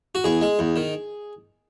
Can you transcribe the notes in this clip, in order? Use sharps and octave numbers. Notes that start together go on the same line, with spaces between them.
F#4
E2 G#4
G#3
E2
D#3